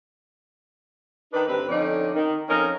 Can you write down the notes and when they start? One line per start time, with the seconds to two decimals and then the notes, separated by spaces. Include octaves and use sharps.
1.33 D#3 D4 D#4 B4
1.47 D2 G2 C4 B4
1.69 F2 D3 C#4 D#4 D5
2.14 D#3
2.48 F2 C#4 D#4 A#4